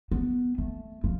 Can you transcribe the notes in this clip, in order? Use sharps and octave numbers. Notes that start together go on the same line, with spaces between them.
B3
A3
F3